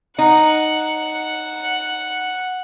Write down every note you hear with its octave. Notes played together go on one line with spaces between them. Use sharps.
D#4 F#5